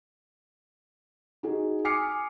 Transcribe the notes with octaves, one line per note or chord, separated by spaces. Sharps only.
D#4 F#4 G#4
G#5 D6 D#6 F6 C7 C#7